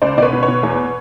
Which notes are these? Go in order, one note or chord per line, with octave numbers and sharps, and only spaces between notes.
C#2 C5 D5
B2 B4 C#5 D5
B2
B4 C#5
B2
E2